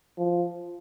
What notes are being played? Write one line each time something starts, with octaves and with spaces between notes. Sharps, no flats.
F3